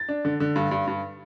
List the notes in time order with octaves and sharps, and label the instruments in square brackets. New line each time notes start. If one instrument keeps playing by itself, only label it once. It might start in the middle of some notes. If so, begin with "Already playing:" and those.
Already playing: [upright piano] A6
D4
D3
D3
G2
G2
G2